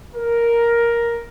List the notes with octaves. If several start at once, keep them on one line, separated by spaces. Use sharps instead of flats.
A#4